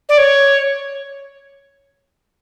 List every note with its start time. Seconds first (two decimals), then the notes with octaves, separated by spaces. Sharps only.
0.09 D5
0.18 C#5